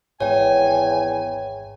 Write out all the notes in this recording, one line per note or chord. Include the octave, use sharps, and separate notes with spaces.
G#1 E2 C#5 G5 G#5